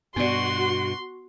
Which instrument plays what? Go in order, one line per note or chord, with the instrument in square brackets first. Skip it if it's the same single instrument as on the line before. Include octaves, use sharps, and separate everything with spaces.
[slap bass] G2 B2 [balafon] B3 D5 [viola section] F#4 [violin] C6